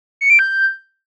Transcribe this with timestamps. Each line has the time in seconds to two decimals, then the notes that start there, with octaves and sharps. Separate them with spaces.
0.21 C#7
0.30 D7
0.39 G6